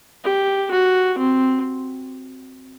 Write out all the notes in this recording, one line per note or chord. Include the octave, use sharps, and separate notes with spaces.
G4
F#4
C4